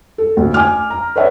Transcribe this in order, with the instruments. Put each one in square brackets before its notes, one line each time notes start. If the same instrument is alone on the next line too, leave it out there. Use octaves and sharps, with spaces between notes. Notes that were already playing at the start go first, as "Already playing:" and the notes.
[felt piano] A4
D2
G#5 D6 F6
A#5
B4 C#5 D5 E5 F#5